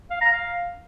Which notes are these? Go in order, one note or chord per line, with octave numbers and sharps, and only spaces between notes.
F5
A#5
F5